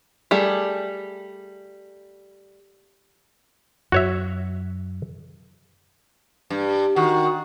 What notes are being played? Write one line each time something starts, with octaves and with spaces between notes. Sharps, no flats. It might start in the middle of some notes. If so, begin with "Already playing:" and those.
G3 A3 G#4
F#2 F#4 C#5 E5
G2
D#3 F#4